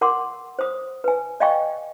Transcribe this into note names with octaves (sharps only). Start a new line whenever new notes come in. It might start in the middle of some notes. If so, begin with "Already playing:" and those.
A#4 F#5 C6 D6
C5 D#6
B4 G#5
D5 D#5 F5 G5 G#5 C#6